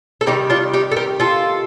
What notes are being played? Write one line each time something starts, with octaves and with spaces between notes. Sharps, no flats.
A4
C3 D#3 G3 D#4 G4
D4 F4
D#4 G4
A4
G4 A#4
F4 A4